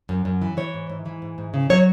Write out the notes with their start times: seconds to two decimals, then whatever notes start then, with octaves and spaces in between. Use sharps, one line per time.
0.09 F#2
0.25 F#2
0.42 E3
0.57 E3 C#5
0.74 G#2
0.90 G#2
1.06 E3
1.22 G#2
1.38 G#2
1.54 C#3
1.70 F#3 C#5